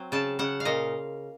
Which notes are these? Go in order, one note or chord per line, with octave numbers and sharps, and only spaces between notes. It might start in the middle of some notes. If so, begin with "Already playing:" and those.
Already playing: F#3 C4
C#3 A5
C#3 F#5
F5
A#2 D#5